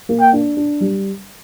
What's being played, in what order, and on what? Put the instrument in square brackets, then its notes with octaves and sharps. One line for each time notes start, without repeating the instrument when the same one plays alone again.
[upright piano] A#3
[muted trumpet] G5
[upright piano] D4
D4
G3